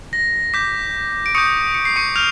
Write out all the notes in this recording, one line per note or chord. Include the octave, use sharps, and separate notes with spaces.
A#6
D6 G6 B6
D7
C#6 D#6 G6 C#7
C#7
C7
C#6 C#7
F6 G6 F7